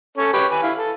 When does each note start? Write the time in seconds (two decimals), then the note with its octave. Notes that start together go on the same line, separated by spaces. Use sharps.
0.17 C#4 A4 C#5
0.33 G4 B4 C#5
0.51 B4 G#5
0.63 E4 F5
0.77 A4